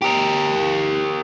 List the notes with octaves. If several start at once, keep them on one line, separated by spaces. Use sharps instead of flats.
G4 A#4